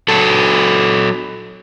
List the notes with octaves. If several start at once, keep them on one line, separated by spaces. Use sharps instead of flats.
F#3 F#4 A4